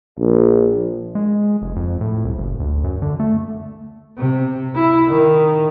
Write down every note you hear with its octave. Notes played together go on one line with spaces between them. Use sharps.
A#1
G#3
F1
F2
A2
C2
F#1
D2
F#2
D3
A3
C3
E4
D#3